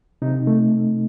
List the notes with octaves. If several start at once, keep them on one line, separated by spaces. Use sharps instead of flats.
C3 D#4
A3